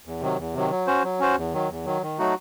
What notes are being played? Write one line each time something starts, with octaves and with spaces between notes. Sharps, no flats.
E2
C3 D#3 F#3
E2
C3 D#3 F#3
F#3
C#4 F#4 C5
F#3
C#4 F#4 C5
E2
D#3 F#3
E2
D#3 F#3
D#3
F#3 A3 D#4 F#4